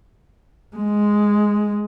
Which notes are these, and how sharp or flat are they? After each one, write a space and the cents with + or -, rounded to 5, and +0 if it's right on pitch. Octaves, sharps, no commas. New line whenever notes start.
G#3 +0